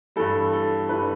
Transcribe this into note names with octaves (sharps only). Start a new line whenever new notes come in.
G2 E3 G3 A4
A4
G2 E3 G3 B4